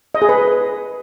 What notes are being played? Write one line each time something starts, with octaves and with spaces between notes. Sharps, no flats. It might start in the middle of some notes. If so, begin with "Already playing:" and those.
D#5
G#4
B4